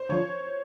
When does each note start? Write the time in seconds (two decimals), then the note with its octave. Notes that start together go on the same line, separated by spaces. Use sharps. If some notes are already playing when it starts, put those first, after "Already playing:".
Already playing: C5
0.09 D3 F3 C#5